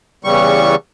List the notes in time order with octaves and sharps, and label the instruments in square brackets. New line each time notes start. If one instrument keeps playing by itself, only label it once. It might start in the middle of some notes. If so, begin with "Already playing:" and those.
[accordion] E2 C#3 G3 C#6